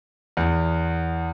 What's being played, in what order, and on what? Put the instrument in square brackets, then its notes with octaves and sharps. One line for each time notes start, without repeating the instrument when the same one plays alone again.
[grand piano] E2